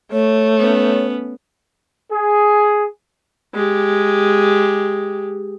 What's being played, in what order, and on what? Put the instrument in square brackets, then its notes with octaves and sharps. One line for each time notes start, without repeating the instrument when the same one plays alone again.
[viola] A3 [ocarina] C#5
[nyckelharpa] B3 C#4
[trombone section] G#4
[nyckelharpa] G#3 G4